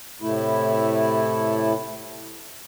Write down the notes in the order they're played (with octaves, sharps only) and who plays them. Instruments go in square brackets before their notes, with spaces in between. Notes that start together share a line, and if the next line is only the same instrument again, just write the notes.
[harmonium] A2 C3 A3 E4